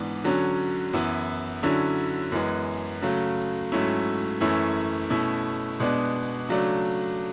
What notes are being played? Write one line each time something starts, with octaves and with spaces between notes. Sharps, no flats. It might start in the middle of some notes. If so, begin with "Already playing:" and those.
Already playing: G#2 E3 B3 D4
D3 F#3 C#4
F#2 E3 B3 E4
D3 F#3 C#4 E4
F#2 E3 G#3 B3
C#3 F#3 A3
G#2 F#3 A3 C#4 E4
F#2 E3 A3 C#4 E4
B2 A3 C#4 E4
B2 G#3 B3 D4
C#3 F#3 A3 D4